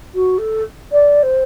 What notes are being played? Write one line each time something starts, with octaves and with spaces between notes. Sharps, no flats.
F#4
A4
D5
C5